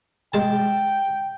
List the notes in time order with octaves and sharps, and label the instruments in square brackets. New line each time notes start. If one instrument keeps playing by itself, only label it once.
[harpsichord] G#3 A5 [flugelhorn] G5